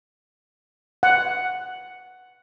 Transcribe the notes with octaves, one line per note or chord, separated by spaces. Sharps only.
F#5